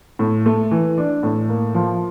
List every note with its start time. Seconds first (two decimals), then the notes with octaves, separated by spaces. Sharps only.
0.19 A2
0.46 A3
0.71 E3
0.98 D4
1.23 A2
1.49 A#3
1.74 F3